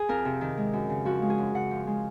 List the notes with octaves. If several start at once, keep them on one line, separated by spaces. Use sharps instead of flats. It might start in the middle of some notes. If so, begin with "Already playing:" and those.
Already playing: G#4
F2 A#4
C3
D#3
G#3
F#2
C#3
F3 F#4
G#3
G#4
F#2
C#3 F#5
F3
G#3